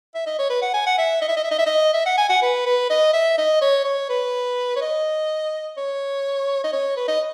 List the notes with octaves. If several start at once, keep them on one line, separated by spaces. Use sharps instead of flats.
E5
D#5
C#5
B4
F#5
G#5
F#5
E5
D#5
E5
D#5
E5
D#5
E5
D#5
E5
F#5
G#5
F#5
B4
B4
D#5
E5
D#5
C#5
C#5
B4
C#5
D#5
C#5
D#5
C#5
B4
D#5